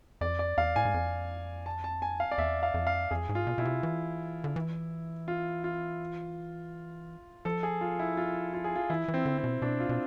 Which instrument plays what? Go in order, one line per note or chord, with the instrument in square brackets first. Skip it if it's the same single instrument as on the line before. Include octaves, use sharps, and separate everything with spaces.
[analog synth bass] F2 [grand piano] D5
[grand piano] D5
[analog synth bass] E2 [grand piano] F5
[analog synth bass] A2 [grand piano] G#5
[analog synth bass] G#2
F2
[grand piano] A5
A5
G#5
F5
D5
[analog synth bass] E2 [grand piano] E5
[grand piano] F5
[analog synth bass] F2
[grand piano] F5
[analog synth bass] F2 [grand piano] G#4
[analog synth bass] G#2
[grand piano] F4
[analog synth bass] B2
[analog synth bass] B2 [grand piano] E4
[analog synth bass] C3
E3
D3
E3
[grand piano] F4
F4
[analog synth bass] F3 [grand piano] A4
[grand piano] G#4
F4
E4
F4
F4
G#4
F4
[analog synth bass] E3 [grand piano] E4
[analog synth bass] E3
[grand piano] C4
[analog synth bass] D3
[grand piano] C4
[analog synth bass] B2
[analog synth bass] B2 [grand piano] D4
[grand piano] F4
[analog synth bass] B2